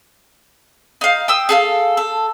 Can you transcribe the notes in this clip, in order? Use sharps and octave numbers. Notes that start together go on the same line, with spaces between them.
D#4 F5
G5 D#6 E6
G#4 A4 F5
A4